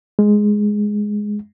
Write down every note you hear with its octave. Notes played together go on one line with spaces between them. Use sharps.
G#3